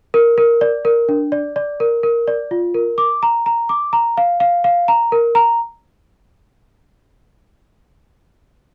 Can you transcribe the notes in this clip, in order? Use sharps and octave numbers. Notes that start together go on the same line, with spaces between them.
A#4
A#4
D5
A#4
D4
D5
D5
A#4
A#4
D5
F4
A#4
D6
A#5
A#5
D6
A#5
F5
F5
F5
A#5
A#4
A#5